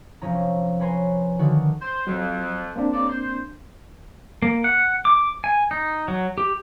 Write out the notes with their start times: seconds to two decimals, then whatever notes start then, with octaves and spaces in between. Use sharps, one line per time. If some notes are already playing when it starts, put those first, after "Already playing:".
0.21 F1 F3 C#4 A#5
0.80 C#4 B4 C#5 G#5 A#5 C6
1.39 D3 D#3 F#4
1.81 C5
2.07 F2 F#3
2.76 A#3 C4 D4
2.92 C#3 D#4 D5
3.08 C5
4.42 A#3
4.64 F#5
5.05 D6
5.44 G#5
5.71 D#4
6.08 F#3
6.38 G4